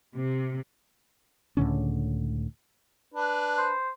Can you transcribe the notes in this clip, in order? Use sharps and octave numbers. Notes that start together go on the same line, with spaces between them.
C3
C#2 A2 D3 C#4
D4 B4
C5